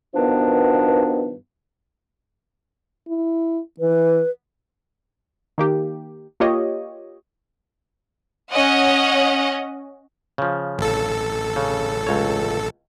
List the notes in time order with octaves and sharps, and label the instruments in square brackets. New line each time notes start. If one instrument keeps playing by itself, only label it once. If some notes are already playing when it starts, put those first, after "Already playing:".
[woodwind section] G2 B2 D#3 F3 B3 D4
[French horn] E4
[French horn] E3 [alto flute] B4
[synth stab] D#3 A#3 G4
A#3 F4 G4 C#5 D#5
[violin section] C#4 D#5 F#5
[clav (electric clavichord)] C#3 F3
[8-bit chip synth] A1 A4
[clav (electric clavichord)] C#3
C#2 C#5